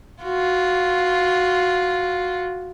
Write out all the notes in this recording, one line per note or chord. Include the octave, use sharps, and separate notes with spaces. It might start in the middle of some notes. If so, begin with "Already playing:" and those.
F4 F#4